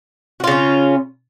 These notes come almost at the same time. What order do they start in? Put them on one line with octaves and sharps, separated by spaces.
F#4 F4 C#3 C#4